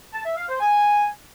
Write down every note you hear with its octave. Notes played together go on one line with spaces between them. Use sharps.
A5
E5
F5
C5
G#5